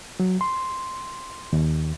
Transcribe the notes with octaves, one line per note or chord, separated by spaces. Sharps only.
F#3
C6
D#2